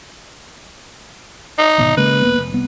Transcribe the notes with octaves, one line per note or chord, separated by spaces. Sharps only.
D#4
D1 G#1 B2
C#3 G#3 A#3 B4
E1 A#3 B3
F1
C2 B3